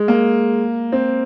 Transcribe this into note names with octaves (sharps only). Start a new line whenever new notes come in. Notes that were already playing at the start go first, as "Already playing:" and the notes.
Already playing: G#3
A#3
C4